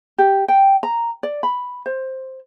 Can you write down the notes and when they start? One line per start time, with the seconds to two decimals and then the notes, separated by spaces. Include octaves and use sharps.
0.18 G4
0.48 G5
0.83 A#5
1.23 D5
1.43 B5
1.86 C5